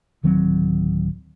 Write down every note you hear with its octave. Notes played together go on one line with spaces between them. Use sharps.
D1 D#3 F#3 C4